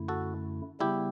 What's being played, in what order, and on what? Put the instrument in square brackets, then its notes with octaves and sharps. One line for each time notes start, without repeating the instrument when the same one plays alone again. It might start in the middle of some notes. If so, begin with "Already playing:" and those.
Already playing: [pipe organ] F#2 D3 A3 E4
[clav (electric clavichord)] F#4 A4
[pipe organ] C#3 G3 B3 [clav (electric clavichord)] E4 G4